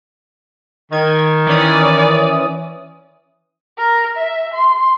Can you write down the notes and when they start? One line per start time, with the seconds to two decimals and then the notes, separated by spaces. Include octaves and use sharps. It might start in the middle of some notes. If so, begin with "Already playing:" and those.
0.92 D#3 G#6
1.47 E3 C#4 D5 D#6
3.78 A#4
4.16 E5
4.54 C6